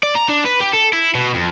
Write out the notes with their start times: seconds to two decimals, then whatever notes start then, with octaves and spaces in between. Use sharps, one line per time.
0.03 D5
0.15 A#5
0.28 D4
0.45 B4
0.60 G4
0.73 A4
0.93 E4
1.15 B2
1.34 F2